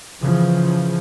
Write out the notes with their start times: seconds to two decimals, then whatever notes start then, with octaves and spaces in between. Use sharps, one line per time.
0.21 C#3 E3 F3